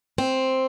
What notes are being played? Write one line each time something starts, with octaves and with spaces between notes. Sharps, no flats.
C4